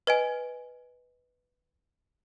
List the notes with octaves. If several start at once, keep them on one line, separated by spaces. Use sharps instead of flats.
B4 D#5 G#5